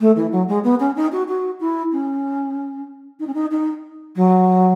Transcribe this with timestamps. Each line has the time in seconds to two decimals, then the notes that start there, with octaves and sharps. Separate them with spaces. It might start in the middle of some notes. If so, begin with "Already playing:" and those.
0.01 A3
0.16 E3
0.32 F#3
0.48 G#3
0.64 B3
0.80 C#4
0.96 D#4
1.12 F#4
1.28 F#4
1.60 E4
1.92 C#4
3.20 D#4
3.27 C#4
3.34 D#4
3.51 D#4
4.16 F#3